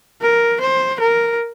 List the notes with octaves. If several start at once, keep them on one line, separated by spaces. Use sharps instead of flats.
A#4
C5
A#4